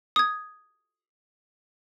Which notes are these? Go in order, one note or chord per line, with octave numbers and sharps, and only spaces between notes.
D#6 G#6